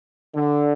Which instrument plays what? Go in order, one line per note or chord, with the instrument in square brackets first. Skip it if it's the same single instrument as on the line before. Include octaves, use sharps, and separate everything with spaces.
[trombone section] D3